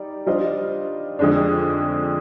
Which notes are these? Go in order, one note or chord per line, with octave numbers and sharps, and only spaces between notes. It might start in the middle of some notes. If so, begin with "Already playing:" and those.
Already playing: G3 D#4 D5
G3 D4 F4 C5 D#5
F2 D3 G#3 D4